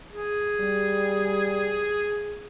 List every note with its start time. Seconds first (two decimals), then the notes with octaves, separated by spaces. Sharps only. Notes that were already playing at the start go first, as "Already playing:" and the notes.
0.12 G#4
0.60 G3